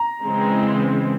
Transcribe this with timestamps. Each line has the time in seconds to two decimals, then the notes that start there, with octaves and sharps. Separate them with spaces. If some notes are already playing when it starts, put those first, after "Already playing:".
Already playing: A#5
0.24 C#3 E3 G#3 C4